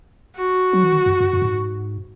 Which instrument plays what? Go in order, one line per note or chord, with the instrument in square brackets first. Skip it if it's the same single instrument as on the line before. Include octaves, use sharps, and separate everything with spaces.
[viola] F#4
[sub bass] F#3
E3
D#3
F#2
F#2
F#2
A2
G#2